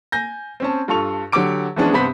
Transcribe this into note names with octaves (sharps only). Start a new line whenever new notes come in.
G#5 G6 A#6
C4 C#4 A5
G2 F4 A4 C#6 F7
D3 F#3 G4 G5 D6 D7
E3 F3 G#3 B3 C#4 D4
G2 C3 B3 C5 B5 B6